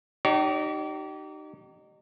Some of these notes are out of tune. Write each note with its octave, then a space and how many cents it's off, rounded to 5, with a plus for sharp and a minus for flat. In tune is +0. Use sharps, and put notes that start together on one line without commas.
D#4 -25 G4 -35 C#5 +25